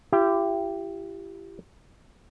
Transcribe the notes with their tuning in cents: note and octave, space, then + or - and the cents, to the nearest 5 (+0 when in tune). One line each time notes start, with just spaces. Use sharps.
E4 +45 G4 +0